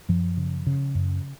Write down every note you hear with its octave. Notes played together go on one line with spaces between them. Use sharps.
F#2 F3
C#3
C#3
F#2